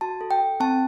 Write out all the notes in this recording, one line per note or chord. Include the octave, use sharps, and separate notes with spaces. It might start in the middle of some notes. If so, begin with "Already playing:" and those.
F#4 A5
A4
G5
A4
C4 A5